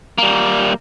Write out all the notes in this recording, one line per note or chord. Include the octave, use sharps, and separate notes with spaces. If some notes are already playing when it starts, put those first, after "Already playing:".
G3 A#3